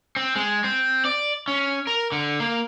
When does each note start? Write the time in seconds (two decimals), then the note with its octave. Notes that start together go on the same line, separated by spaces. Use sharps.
0.16 C4
0.35 G#3
0.64 C4
1.05 D5
1.48 C#4
1.87 A#4
2.12 D3
2.40 A#3